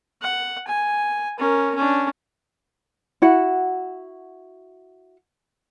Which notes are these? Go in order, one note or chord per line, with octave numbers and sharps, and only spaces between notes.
F#5
G#5
C#4 A#4
C#4 D4
E4 F#4 F#5